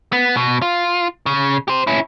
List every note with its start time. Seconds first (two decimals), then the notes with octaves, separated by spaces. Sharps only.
0.12 B3
0.37 B2
0.62 F4
1.26 C#3
1.68 G4 C5
1.87 C#4 E4